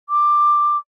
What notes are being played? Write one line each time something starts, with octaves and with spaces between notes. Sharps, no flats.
D6